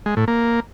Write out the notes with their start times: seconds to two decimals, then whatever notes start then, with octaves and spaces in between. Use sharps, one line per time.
0.06 G#3
0.17 A2
0.28 A#3